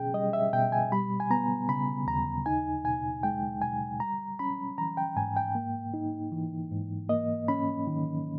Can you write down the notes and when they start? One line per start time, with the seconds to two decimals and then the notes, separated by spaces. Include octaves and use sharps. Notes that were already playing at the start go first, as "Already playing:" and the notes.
Already playing: B2 C#4 G#4 G5
0.14 G3 D#5
0.33 E5
0.53 B2 G5
0.72 G#5
0.92 G3 B5
1.20 G#5
1.30 B3 A#5
1.69 C#3 B5
2.07 D#2 A#5
2.46 D#4 G#5
2.85 B2 G#5
3.23 G#3 G5
3.62 B2 G#5
4.00 G3 A#5
4.39 C#4 B5
4.78 E3 A#5
4.97 G5
5.16 G#2 G#5
5.36 G5
5.55 A#3
5.94 D#4
6.32 E3
6.71 G#2
7.09 A#3 D#5
7.48 C#4 B5
7.87 D#3